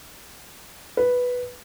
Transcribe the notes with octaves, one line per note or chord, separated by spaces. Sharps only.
B4